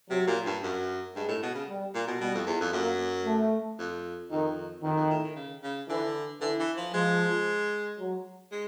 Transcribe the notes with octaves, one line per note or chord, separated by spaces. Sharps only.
C3 F#3
A#2
G2
F#2
G2 G#3
A2
B2
C#3
G3
A#2
B2
B2 G3
F2
E2
F2
F#2 A#3
A3
F2
F2 D#3
F2 D#3
F2
A2
D#3
C#3
C#3
D3 E3
D3 E3
E3
F3
F3 G#3
F#3
G#3